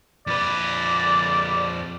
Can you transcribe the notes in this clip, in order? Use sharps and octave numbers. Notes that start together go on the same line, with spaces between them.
F2 B4 D5